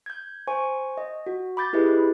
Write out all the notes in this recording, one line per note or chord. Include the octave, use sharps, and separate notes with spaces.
G6 G#6
C5 G#5 C#6
D#5
F#4
B5 D6 G6 A6
E4 G4 G#4 B4 D#5